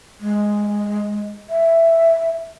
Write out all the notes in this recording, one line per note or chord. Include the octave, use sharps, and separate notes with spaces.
G#3
E5